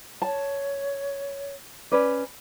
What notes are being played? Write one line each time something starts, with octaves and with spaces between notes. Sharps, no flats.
C#5 A5
C#4 B4 D5